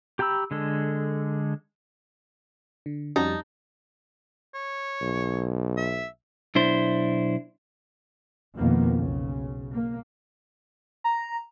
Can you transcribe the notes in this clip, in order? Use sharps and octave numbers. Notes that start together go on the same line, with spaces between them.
G4 G5 A#5 B5 E6
D3 G#3 A4
D3
F2 G3 C#4 D#4 F#4 G4 A5
C#5
B1
E5
B1 D4 E4 C5
F2 B2 D#3 F3 A#3 B3
B1 C#3
A#3
A#5